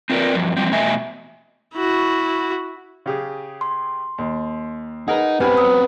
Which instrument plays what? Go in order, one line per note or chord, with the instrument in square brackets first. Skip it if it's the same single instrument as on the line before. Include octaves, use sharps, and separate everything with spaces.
[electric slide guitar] C4 F4 A#4 B4 D5
G2 F3 F#3
E3 F3 G3 C4
E2 B2 A3 D#5 E5 G#5
[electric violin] E4 F#4
[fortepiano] C#3 G4 G#4
[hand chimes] C6
[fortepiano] D#2
[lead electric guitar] D#4 [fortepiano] G#4 A#4 B4 [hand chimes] F#5
[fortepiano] G2 G3 G#5 [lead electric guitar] B3 C4 [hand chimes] B4 B5
[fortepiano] F#3 E6 [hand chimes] D#6